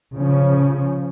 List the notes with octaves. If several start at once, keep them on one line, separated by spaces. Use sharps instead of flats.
C#3 F3 C#4